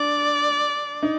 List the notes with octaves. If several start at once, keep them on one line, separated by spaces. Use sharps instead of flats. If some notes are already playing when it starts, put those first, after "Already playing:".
Already playing: D4 D5
D#4